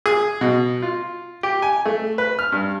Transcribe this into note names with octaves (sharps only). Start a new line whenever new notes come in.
G#4
B2
F4
G4
G#5
A3
B4
F6
G2